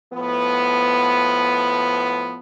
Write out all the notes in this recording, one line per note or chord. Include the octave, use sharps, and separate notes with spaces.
A2 F3 B3